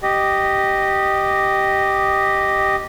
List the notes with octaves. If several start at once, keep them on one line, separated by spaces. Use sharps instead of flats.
G4 D#5